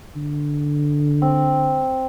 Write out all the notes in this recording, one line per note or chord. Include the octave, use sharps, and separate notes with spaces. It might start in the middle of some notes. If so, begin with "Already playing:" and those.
D3
C4